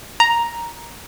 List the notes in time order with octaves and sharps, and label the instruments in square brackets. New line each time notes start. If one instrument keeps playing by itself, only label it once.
[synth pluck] A#5